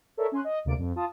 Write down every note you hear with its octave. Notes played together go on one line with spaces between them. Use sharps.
A4 A#4 C#5 D5 E5
C#4 G#5 C6 F#6
D#5
D2 C3 A#3 D5 D7
F2
F4 A5 D#6